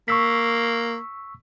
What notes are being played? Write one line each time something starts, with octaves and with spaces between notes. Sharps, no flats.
A#3 C#6 E6 B6